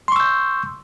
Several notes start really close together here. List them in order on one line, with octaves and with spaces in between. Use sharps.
C6 C#6 E6 G6